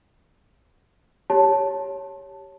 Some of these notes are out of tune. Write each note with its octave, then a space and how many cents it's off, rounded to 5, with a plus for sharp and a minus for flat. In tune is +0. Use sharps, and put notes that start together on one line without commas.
G4 +0 C#5 +0 A5 +0